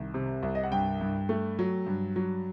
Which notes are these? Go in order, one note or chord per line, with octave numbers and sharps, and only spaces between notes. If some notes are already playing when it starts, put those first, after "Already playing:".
Already playing: C2 D#3
C3
C2
D#5
F#5
G2 G5
G2
A3
F#3
G2
F#3